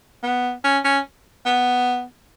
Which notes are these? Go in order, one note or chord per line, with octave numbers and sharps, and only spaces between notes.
B3
C#4
C#4
B3